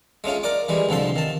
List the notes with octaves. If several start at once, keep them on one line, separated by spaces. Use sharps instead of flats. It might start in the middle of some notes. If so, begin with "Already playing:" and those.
G#3 A3 C#4 F4
A#4 D5 D6
E3 G3 G#3
C2 D3 F3 A4 C6
D#3 A5